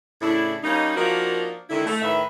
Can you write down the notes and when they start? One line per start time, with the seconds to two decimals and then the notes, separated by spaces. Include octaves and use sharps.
0.21 A2 C#3 D4 E4
0.63 G3 A#3 C#4 D#4
0.96 F3 A#3 D4 D#4 F#4 A#4
1.70 D3 D#3 G#3 E4
1.86 A3
2.02 A2 D#3 B4 E5